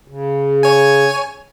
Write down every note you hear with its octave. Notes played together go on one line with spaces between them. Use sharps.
C#3
C#5 G#5